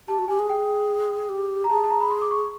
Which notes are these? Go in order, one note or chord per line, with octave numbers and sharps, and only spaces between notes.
G4 A5
F#4
G4 G#5
G#4
G5
G4
A#5
G#4 A5
A5
A#5
B5
C6
D6
C#6